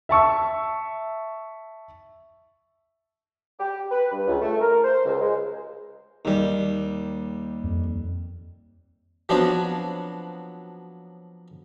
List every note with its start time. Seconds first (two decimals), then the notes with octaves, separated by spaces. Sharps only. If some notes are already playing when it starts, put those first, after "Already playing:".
0.09 E5 A5 C#6 E6
3.60 G4
3.91 B4
4.12 G2
4.27 C#2
4.41 A3
4.61 A#4
4.84 C5
5.05 C#2
5.21 G#3
6.25 D#2 G3
7.64 F2
9.29 F3 F#3 B3 C4 D4 F#4